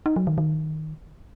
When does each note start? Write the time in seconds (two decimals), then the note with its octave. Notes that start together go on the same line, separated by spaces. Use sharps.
0.06 D#4
0.16 F#3
0.27 D#3
0.38 D#3